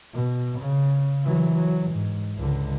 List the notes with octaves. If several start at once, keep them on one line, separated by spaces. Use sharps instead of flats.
B2
C#3
E3 F#3
F#3
G#2
C#2 D3